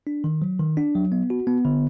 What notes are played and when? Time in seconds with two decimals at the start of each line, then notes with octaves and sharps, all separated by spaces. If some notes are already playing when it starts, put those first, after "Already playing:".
0.07 D4
0.24 D#3
0.42 F#3
0.59 D#3
0.77 D4
0.95 F#3
1.12 B3
1.30 F#4
1.47 B3
1.65 D3